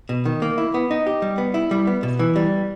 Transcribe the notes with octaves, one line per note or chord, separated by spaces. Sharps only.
B2
D#3
A#3
E4
B3
D#4
G4
G3
B3
E4
G3
B3
B2
E3
G3